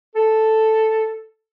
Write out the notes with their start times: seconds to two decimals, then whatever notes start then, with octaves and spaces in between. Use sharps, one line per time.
0.15 A4